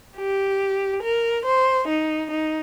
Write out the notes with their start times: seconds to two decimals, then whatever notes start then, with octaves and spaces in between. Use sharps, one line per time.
0.16 G4
1.02 A#4
1.45 C5
1.88 D#4
2.30 D#4